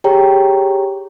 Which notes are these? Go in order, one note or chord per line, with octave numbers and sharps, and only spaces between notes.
G4 G#4 C#5 G5 A#5